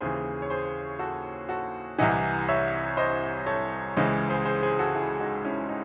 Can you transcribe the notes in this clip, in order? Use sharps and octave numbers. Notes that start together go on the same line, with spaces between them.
D#2 C#3 E3 G#4 C5
C#5
G#4 C5
F#4 A4
F#4 A4
C2 C3 E3 D#5 F#5
C#5 E5
C5 D#5
A4 C#5
C#2 C#3 E3 C5 D#5
G#4 C5
G#4 C5
G#4 C5
F#4 A4
E4 G#4
D#4 F#4
C#4 E4
D#4